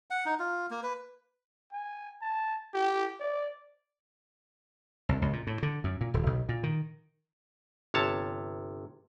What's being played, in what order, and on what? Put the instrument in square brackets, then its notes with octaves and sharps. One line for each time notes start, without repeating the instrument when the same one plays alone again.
[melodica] F#5
D#4
F4
A#3
B4
[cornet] G#5
A5
G4
D5
[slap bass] C2
C#2
A#2
A2
D3
F#2
A#2
D#1
B1
A#2
D#3
[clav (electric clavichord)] G1 C3 C#5 A5